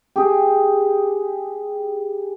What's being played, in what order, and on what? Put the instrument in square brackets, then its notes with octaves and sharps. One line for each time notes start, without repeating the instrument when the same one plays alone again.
[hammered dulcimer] G4 G#4